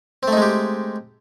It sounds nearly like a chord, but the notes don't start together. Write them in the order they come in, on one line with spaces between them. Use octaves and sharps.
C4 A3 D#4 G#3 G4